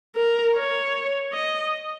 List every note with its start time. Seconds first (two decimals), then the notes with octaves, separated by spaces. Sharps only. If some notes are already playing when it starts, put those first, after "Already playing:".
0.16 A#4
0.55 C#5
1.33 D#5